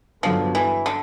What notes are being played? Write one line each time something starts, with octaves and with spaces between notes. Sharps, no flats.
G2 D3 F3 F#3 B3
E3
D3